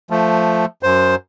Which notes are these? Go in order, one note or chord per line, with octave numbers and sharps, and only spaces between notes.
F3 A3
F#2 C5